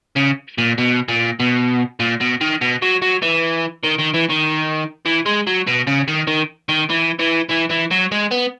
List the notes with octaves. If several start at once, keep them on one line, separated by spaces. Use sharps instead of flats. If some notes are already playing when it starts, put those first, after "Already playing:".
C#3
A#2
B2
A#2
B2
A#2
B2
D#3
B2
F#3
F#3
E3
D#3
D#3
E3
D#3
E3
G#3
F#3
B2
C#3
D#3
D#3
D#3
E3
E3
E3
E3
F#3
G#3
B3